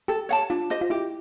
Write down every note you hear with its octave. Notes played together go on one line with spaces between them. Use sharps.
G4 A4
C#5 F#5 A5
D4 F4
G4 C5 D#5
F4
E4 G4